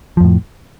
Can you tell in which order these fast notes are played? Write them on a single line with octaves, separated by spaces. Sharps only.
F3 F2 A2